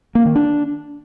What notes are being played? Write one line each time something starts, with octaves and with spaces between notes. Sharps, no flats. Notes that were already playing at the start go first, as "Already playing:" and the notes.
A#3
D#3
D4